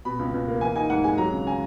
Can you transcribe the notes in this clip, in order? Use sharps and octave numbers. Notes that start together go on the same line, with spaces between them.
B2 B5
C#2
C#2
A#3
E3 G#5
D#4 G#5
G#2 F#5
G#3 G#5
F#3 A#5
C#3
C#3 G#5